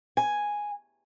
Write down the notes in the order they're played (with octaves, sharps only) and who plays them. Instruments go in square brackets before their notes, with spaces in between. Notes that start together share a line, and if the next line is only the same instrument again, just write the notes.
[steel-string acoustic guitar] G#5